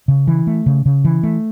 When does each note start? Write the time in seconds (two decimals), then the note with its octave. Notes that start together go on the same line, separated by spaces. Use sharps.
0.08 C#3
0.27 E3
0.47 A3
0.66 C#3
0.86 C#3
1.05 E3
1.23 A3